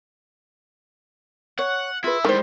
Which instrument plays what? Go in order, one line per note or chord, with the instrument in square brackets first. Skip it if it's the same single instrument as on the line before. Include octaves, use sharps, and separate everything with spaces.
[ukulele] C#5 [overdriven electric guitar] F#5
[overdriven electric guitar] E4 [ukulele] F4 G#4 B4
[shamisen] D#3 [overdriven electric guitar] G3 G#3 [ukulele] E4 C5